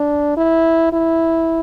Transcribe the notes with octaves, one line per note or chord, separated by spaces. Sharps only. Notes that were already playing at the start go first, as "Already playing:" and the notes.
Already playing: D4
E4
E4